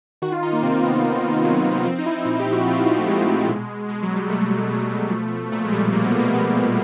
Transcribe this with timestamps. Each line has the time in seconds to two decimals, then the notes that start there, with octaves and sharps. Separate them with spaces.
0.22 D#3 F#4
0.32 F4
0.42 D#3 D#4
0.53 A#3
0.63 C3 C4
0.83 C3 B3
1.03 D#3
1.24 D#3
1.44 C3 F#3
1.58 F#3
1.65 C3
1.72 B3
1.85 F3 C4
1.98 D#4
2.05 F3 E4
2.12 D#4
2.25 A#2 D#4
2.40 G4
2.46 A#2
2.53 F#4
2.67 F3 F4
2.76 E4
2.87 F3 D#4
2.97 A3
3.07 A#2 G#3
3.28 A#2
3.49 B2
3.69 B2
3.89 B2 G#3
4.03 F#3
4.09 B2
4.16 G3
4.30 B2 A3
4.51 B2
4.71 B2
4.90 B2
5.11 F3
5.32 F3
5.52 A#2 A3
5.65 G#3
5.72 A#2 G3
5.93 F3 A#3
6.06 B3
6.13 F3
6.19 A#3
6.33 A#2 B3
6.54 A#2